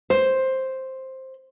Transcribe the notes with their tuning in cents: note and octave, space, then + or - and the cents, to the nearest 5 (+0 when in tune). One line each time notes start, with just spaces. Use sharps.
C5 +5